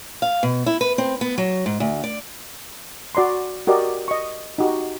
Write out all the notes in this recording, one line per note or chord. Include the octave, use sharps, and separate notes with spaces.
F5
B2
E4
B4
C4
B3
F#3
G#2
D2
D5
F#4 D5 A#5 C6
F#4 G4 A#4 D5 D#5
D#5 C#6
D#4 F#4 G4